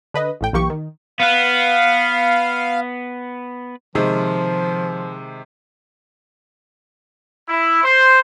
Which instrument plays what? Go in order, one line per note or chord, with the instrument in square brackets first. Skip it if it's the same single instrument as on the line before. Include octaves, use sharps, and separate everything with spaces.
[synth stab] D3 B4 D#5
A1 A2 G5
B1 E3 A#3 G4 C#6
D#3
[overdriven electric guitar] B3 B4 [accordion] F5
[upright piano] C3 D#3 G#3 [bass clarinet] F3
[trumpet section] E4
C5